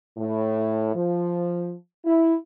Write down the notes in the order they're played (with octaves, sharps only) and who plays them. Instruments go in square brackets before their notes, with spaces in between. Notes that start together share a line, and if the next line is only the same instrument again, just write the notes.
[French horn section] A2
F3
E4